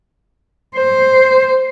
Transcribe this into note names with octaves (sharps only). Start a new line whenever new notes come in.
C5